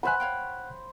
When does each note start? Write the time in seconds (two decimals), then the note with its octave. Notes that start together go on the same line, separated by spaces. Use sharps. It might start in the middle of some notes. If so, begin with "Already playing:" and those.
0.03 B4 C5 E5 F#5 G#5 B5 F#6
0.20 C#5 F5 G5